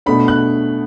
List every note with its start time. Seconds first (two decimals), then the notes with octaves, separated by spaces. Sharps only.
0.06 B2 A3 D4 B5
0.28 F#6